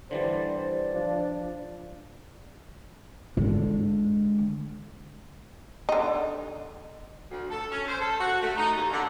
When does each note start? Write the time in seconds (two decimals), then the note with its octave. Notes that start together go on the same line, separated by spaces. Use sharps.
0.11 D3 E3 G3 C5 D5
0.61 D5
0.94 F3 D4
3.37 D3 G#3
5.89 D3 D#4
7.31 D2
7.50 A4
7.71 C#4
7.88 C5
8.01 A4
8.19 F#4
8.42 A3
8.57 D#4
8.76 D#2
8.92 D3